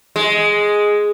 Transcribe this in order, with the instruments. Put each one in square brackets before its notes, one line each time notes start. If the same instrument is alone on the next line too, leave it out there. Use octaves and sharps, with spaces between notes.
[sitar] G#3